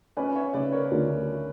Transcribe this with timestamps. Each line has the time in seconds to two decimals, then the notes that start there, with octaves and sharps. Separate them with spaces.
0.17 C#4 B4 D5
0.36 C#5 E5
0.54 C#3 B4 D5
0.72 A#4 C#5
0.91 D2